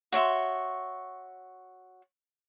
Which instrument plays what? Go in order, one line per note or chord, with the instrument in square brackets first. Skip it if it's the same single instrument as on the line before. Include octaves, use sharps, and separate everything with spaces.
[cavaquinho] F#4 C#5 E5 C6